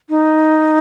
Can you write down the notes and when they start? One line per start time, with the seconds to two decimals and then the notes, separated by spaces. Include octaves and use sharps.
0.09 D#4